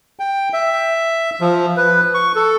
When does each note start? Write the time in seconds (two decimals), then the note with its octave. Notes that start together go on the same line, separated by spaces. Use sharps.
0.19 G5
0.53 E5
1.41 F3
1.77 B4
2.14 C#6
2.35 A4